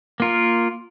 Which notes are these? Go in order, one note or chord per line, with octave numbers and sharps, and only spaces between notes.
A#3 F4 A#4